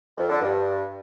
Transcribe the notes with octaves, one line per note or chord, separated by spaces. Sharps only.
F2
D3
G2